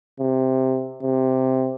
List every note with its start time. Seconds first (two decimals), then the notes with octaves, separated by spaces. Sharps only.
0.20 C3
1.03 C3